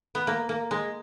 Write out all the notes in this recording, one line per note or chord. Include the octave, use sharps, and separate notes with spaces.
B3
A#3
A#3
G#3